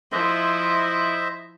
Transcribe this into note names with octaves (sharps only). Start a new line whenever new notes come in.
F3 E4 C5 D#5 E5